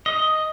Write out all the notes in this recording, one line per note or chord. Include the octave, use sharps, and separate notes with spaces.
D#5